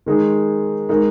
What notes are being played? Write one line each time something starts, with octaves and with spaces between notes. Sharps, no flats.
D#3 G#3 D#4 G#4
G#3 D#4 A#4